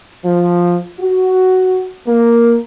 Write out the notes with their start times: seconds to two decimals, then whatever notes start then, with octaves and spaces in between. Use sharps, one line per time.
0.25 F3
1.00 F#4
2.07 A#3